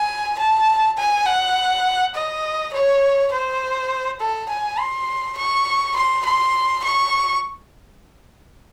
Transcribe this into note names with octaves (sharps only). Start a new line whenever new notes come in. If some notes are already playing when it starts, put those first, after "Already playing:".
Already playing: G#5
A5
G#5
F#5
D#5
C#5
C5
A4
G#5
C6
C#6
C6
C6
C#6